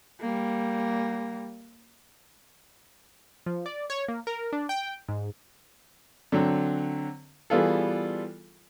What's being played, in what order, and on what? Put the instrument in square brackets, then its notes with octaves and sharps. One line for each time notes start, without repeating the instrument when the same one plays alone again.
[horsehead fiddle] G3 A#3
[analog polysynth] F3
D5
C#5
A#3
A#4
D4
G5
G#2
[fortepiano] D3 F#3 C4
E3 G3 B3 F4 G#4 A4